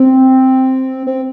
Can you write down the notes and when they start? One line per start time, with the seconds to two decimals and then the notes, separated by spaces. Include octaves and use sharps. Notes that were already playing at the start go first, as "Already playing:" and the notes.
Already playing: C4
1.07 C4